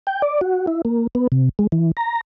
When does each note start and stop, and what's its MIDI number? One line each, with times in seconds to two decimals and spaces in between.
0.07 0.22 79
0.22 0.41 74
0.41 0.66 66
0.67 0.82 64
0.85 1.07 58
1.15 1.27 59
1.32 1.49 48
1.59 1.67 56
1.72 1.91 52
1.97 2.21 82